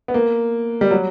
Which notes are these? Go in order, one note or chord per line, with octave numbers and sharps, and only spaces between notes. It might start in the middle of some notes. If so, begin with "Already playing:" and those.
B3
A#3
G3
F#3